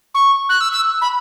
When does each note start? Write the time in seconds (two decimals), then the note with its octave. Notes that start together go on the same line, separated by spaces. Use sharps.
0.14 C#6
0.49 F#6
0.61 E6
0.73 E6
1.01 B5